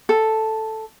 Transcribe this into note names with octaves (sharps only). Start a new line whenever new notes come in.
A4